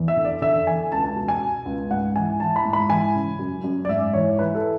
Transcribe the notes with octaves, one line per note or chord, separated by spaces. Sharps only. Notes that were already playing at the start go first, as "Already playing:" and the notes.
Already playing: E2
E5
D3
D5
D3 E5
E2 G#5
C#2 A5
A5
B2
G#5
B2
C#2
G#2 F#5
E3 G#5
E3 A5
B5
G#2
B5
E3 G#5
C#3
F#2
F#2
D5
G#2 E5
E3 C#5
E3 B4
A4